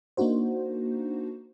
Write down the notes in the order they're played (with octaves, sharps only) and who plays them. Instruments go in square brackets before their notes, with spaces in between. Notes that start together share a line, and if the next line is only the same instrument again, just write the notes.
[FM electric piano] A#3 D4 D#4 F#4 C5